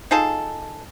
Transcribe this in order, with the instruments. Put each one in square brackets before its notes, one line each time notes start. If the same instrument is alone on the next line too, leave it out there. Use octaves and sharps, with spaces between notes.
[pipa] D#4 F4 G#4 A4